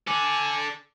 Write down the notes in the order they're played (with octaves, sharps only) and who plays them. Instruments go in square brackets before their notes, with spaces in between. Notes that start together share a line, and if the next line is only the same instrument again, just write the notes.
[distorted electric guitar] A4 D5 [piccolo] G#5